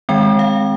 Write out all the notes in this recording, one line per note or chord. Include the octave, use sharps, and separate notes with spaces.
D#3 G#3 C4 G5
F5